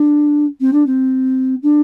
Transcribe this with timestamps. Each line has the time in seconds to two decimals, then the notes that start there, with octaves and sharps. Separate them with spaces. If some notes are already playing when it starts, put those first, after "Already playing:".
Already playing: D4
0.60 C4
0.72 D4
0.86 C4
1.62 D4